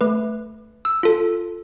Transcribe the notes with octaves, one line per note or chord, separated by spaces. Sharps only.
A3 B4
E6
F4 A4